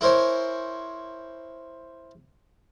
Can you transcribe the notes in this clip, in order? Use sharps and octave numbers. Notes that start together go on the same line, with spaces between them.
E4 A#4 C5 C#5 G#5